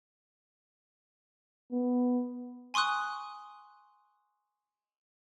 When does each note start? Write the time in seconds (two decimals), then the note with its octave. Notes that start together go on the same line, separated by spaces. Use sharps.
1.72 B3
2.74 G#5 C6 C#6 D#6 F#6